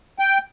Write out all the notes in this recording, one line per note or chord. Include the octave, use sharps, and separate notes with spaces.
G5